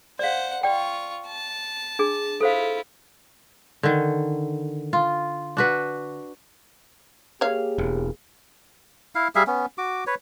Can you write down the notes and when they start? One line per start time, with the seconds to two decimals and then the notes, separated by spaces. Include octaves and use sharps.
0.19 C5 D5 F5 F#5
0.63 F4 D5 G5 C#6
1.27 A5
1.99 D4 G#4
2.41 E4 F4 A4 C5 F5
3.83 D3 D#3
4.93 F4
5.57 D4 F#4 B4
7.41 A#3 G4 G#4 C#5 F5
7.78 E1
9.15 E4 F5
9.35 G3 G#4 E5 F5
9.47 B3 C#4
9.78 F#4 D6
10.07 B4 C#5